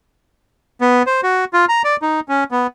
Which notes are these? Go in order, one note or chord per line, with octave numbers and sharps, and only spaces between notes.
B3
C5
F#4
F4
A#5
D5
D#4
C#4
B3